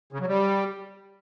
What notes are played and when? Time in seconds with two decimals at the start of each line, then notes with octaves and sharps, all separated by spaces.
0.13 C#3
0.20 F#3
0.28 G3